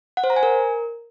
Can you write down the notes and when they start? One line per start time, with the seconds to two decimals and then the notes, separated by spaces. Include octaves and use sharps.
0.17 F#5
0.24 C5
0.30 A#5
0.36 G#5
0.43 A#4